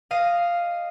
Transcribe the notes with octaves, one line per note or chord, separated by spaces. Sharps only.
D#5 F5 D#7